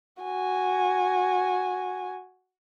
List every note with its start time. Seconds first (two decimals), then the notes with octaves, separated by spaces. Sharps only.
0.23 F#4 G#5